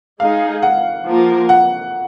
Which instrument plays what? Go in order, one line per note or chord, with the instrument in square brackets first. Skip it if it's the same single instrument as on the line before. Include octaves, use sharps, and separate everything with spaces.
[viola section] G#3 D#4 G#4 [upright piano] F5
[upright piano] F#5
[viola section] F3 A#3 F4 A#4
[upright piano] F#5